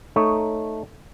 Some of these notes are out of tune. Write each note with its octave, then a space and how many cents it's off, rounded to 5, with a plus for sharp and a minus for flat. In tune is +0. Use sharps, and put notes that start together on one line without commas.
A3 +0 D#4 +0 C#5 +0